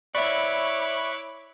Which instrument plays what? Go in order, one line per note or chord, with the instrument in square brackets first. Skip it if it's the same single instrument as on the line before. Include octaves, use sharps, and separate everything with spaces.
[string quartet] E4 C#5 D6 [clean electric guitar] D5 E5 [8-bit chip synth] B5 C#6 F#6